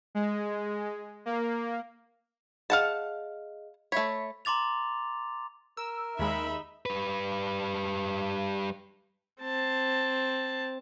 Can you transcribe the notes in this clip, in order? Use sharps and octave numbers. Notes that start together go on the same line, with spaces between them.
G#3
A#3
G#4 D#5 F5 F#5 A5
A3 C#5 E5 B5 B6
A#5 C6 D6 A6 F7
A#4 E6
D#2 G#3 D#4 E5 B5
G3 B4
C4 A5